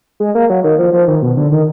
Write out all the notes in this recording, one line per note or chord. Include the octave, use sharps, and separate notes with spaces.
G#3
A#3
F#3
D#3
F3
F3
D#3
B2
D3
D#3